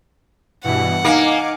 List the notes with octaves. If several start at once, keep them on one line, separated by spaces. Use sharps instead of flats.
G2 B2 E3 F#5
A#3 D#4 F5 G#5 D6